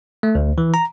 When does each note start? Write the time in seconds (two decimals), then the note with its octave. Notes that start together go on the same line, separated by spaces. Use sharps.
0.23 A3
0.35 D2
0.58 E3
0.74 A#5